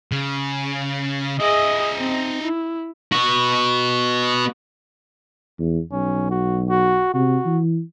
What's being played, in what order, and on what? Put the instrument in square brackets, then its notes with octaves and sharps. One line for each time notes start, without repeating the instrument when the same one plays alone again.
[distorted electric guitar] C#3
[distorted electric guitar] D#4 E5 [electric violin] G#4 D#5
[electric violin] C4
E4
[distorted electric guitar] B3 F#4
[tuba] E2
[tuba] B1 [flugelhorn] C#4
[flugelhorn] F#4
F#4
[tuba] C3 [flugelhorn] F#4
[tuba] E3